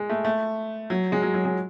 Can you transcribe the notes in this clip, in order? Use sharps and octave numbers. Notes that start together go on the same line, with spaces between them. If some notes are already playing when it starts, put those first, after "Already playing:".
Already playing: G#3
A3
A3
F#3
G#3
F#3
F#3
G#3